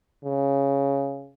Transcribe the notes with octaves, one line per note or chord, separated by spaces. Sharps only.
C#3